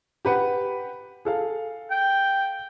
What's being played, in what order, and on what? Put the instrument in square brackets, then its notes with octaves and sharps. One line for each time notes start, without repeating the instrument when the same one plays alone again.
[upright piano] G4 B4 F#5
G#4 A4 F5
[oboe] G5